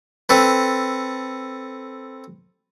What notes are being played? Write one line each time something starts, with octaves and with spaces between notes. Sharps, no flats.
C4 A4 B4